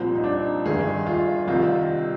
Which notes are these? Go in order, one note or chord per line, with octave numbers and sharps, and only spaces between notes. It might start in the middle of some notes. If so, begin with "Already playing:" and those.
Already playing: C2 A#2 F3 C4
D#4
D4
G1 G2 D#3 G#4
F4
C2 C3 D#3 F4